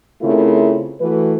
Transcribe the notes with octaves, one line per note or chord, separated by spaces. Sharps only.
C#3 A3 C4 E4 F4 A#4
E3 A3 F#4 B4